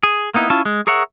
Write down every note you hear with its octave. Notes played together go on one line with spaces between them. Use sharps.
G#4
A#3 B3 D#4 E4
C#4 E4 F4 A5
G#3
G#4 A#4 C#5 E5 F#5